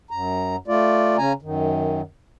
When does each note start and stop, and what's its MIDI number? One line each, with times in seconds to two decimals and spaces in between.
0.11 0.56 42
0.11 0.56 82
0.68 1.17 57
0.68 1.17 65
0.68 1.17 74
1.17 1.33 49
1.17 1.33 61
1.17 1.33 80
1.17 1.33 82
1.42 2.01 42
1.42 2.01 51